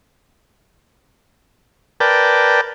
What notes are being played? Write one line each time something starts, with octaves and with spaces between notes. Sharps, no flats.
A#4 B4 D5 G5 A5